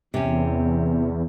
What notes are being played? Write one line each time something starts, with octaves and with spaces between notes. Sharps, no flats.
E2 C3 C#4